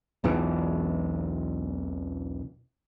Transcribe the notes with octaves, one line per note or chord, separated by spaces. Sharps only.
B1 E2 B2 E3